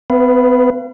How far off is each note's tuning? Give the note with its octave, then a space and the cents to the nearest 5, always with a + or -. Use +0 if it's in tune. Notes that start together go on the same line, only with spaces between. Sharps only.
B3 +45 B4 +0 F5 -40